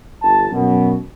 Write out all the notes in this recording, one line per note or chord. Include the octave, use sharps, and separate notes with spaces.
G1 A5
F#2 B2